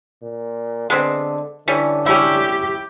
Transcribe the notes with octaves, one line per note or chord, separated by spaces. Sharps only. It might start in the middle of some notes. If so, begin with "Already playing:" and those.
A#2
D3 G#3 B3 C4
D3 E3 G3 C#4
C#4 E4 G4